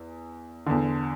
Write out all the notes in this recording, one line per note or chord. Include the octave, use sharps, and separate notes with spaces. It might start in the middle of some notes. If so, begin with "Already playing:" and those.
Already playing: E2
E2 D3